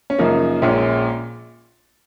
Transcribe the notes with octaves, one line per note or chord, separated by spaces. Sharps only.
C#4
F#2 C#3 F3 A#3 D#4
A#1 A#2 G#3 C#4